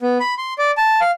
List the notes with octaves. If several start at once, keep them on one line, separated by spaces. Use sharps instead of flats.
B3
B5
C6
D5
A5
F5